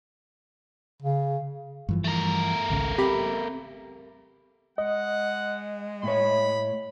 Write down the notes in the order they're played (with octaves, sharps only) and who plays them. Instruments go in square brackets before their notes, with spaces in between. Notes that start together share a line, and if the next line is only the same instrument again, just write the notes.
[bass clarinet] C#3
[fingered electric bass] G2 E3 F3
[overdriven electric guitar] A3 A#4
[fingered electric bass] G#1 C#2 C#3
[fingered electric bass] C4 [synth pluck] G4 B5
[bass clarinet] G#3 [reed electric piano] D#5 [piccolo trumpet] F#5
[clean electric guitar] A2 C#5 [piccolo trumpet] B5